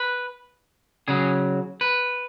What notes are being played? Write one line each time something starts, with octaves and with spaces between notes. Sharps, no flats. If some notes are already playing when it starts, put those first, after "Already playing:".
Already playing: B4
C#3 F#3 G#4
B4